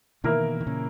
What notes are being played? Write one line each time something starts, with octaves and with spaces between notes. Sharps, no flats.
B2 D#3 E3 A#3 E4 A#4
D#3
A#2 C#3